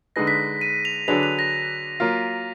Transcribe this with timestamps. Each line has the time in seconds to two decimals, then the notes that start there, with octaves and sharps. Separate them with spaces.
0.16 D3 G#3 D#4 G#4 B4 A#6
0.27 B6
0.61 D#7
0.85 F7
1.08 D3 F#3 D4 G#4 B4 F7
1.23 F7
1.39 A#6
2.00 F#3 A#3 F4 A#4